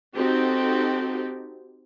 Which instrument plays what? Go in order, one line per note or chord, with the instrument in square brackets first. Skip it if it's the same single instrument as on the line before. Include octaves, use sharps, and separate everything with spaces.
[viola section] C4 D#4 F#4 G4 A4